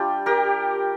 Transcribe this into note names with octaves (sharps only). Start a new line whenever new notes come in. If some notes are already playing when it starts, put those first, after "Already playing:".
Already playing: G3 D4 F4 G4
G4 A#4